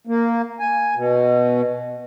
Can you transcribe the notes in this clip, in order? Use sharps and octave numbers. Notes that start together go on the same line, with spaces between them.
A#3
G#5
B2